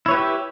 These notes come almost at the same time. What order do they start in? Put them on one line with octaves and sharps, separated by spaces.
E4 C#5 B4 G4 E5